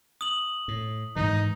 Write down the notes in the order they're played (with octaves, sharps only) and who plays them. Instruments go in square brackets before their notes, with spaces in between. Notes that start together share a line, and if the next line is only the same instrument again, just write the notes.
[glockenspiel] D#6 F#7
[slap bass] A2
[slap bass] G#2 D#3 E3 [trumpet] D#4